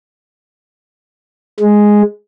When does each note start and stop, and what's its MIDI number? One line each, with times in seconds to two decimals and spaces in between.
1.60 2.02 56